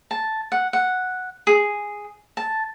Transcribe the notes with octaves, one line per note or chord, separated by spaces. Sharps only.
A5
F#5
F#5
G#4
A5